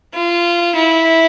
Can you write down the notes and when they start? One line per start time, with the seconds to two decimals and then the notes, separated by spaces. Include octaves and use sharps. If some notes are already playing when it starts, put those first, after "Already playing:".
0.14 F4
0.76 E4